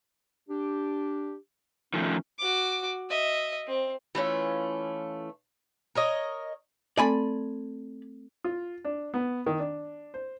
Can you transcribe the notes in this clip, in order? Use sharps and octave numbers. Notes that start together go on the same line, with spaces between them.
D4 G4
D#3 F3 A3 C#4
F#4 D6
D#5 E5
C4
E3 A3 C#4 F4
A#4 C#5 D#5
A3 C4 A4 D5 G#5 B5
F4
D4
B3
D#3
D4
C5